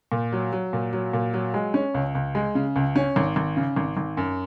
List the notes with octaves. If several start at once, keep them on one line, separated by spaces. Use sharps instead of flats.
A#2
F#3
F#3
A#2
F#3
A#2
F#3
G#3
C#4
C#2
C#2
G#3
C#3
C#2
C#4
G#1
G#1
C#3
G#1
G#1
F#2